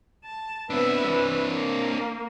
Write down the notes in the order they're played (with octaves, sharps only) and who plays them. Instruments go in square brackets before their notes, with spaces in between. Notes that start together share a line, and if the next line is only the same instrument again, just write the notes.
[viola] A5
[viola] B3 E5 [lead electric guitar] C4 D4
[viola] E3
A#3